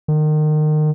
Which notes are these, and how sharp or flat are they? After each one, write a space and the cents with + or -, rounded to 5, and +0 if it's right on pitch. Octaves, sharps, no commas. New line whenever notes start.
D#3 -30